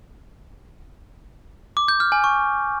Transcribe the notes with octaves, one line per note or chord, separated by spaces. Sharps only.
D6
G6
F6
G#5
C#6